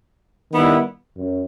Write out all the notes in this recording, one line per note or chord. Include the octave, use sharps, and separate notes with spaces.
D#3 G3 B3 E4 B4
F#2